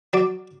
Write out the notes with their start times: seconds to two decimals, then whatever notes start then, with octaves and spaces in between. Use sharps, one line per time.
0.13 F#3 D5